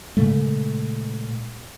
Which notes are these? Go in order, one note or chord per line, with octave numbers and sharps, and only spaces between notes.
A#2 C#3 G#3 A3